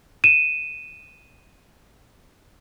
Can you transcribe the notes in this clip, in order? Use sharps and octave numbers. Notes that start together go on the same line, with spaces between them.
D#7 E7